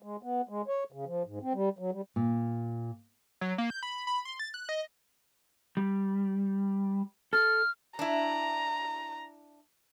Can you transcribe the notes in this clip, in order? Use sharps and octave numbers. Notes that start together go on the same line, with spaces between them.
G#3
B3
G#3
C#5
C#3
F3
G#2
C4
G3
F#3
G3
A#2
F#3
A#3
G6
B5
B5
C6
A6
F#6
D#5
G3
A4 F6
D4 E4 A#5